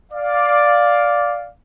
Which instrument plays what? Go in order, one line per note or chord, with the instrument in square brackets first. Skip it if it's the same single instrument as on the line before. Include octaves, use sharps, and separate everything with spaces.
[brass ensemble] D5 F5